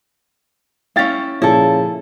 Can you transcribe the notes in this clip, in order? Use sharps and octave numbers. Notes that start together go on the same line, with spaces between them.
C#4 E4 F5 G5 A6
A#2 C#3 F3 E4 A4